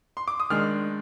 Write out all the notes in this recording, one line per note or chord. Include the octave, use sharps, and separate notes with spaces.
C6
D6
D#6
D#3 G#3 D4 F6